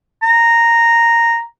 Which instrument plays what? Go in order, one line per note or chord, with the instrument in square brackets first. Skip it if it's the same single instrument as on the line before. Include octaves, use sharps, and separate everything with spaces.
[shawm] A#5